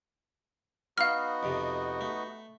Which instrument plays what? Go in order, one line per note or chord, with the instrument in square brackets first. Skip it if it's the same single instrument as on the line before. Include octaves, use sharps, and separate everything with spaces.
[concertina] B3 D#4 F#4 [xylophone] F5 F6
[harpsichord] F2 C3
A3